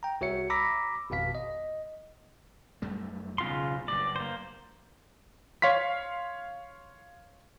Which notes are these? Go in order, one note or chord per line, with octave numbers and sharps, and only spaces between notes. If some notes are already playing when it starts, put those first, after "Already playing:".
G5 A#5
C2 F#4 C#5 E5 C#7
A#5 B5 D6 E6 A#6 B6
G#1 F2 B2 F5 B6
D#5
F#2 G3 A3
B1 E2 G#2 C#3 F4 C6
F#1 G2 D5
A#3 C5
C#5 F5 C6 B6